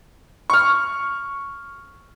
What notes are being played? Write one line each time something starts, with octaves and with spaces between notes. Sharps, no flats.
C#6 F6